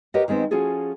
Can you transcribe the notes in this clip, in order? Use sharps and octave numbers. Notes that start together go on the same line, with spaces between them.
G4 A#4 B4 C#5 D#5 F#5
D#3 G#3 B3 C4
F3 C#4 F4 F#4 G#4 A4